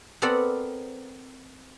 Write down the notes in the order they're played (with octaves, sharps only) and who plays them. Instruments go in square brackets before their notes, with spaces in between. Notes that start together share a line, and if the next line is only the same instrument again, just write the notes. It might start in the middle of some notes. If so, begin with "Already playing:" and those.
[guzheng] B3 C4 A4 A#4 D5 F#5